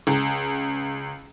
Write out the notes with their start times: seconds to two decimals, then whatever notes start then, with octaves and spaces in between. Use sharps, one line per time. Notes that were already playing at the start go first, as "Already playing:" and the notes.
0.07 C#2